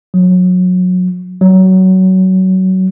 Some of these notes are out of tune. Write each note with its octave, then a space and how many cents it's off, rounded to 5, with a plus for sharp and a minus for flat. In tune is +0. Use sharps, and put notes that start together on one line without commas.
F#3 -25
F#3 +20